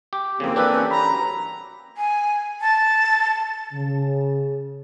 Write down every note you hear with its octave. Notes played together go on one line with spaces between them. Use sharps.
G4
F2 C#3 E3 A#3 C4
D4 G4 A4 B4
C#4
A#5 B5
F#3
G#5
A5
C#3